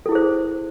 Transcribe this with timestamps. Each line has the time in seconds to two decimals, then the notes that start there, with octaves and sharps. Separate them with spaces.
0.06 A4
0.09 E4
0.12 G#4
0.15 C5